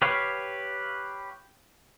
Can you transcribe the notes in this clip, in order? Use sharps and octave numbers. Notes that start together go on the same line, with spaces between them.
G4 B4 C#5 F5